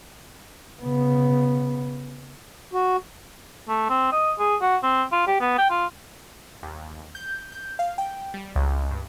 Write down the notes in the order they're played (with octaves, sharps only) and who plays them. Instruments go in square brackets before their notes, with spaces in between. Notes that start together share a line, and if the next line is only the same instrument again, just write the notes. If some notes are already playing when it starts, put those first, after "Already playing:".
[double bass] C#3 B3
[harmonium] F#4
[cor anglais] A3
C4
D#5
G#4
F#4
C4
F4
G4
B3
G5
F4
[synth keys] D#2
G6
G6
F5
G5
G3
C#2
G2